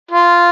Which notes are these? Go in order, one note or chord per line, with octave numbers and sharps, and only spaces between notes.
F4